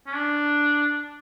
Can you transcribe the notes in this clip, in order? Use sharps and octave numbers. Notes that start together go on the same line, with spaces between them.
C#4
D4